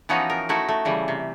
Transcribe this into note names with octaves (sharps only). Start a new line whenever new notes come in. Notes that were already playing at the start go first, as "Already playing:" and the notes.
E3 F3 B3 C#4 D#4 F#4
A#4
A3 D#4 E4 F#4
A3
C#3 E3 G3
C3